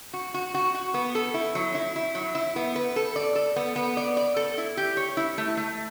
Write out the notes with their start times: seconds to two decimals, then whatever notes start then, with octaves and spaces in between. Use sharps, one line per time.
0.13 F#4
0.34 F#4
0.54 F#4
0.74 F#4
0.94 B3
1.15 A4
1.34 E4
1.55 F#3
1.75 E4
1.96 E4
2.15 F#3
2.35 E4
2.56 B3
2.76 B4
2.96 A4
3.16 D5
3.35 A4
3.56 B3
3.76 B3
3.97 D5
4.17 D5
4.36 A4
4.58 E4
4.77 G4
4.97 C#5
5.17 E4
5.38 A3
5.57 A3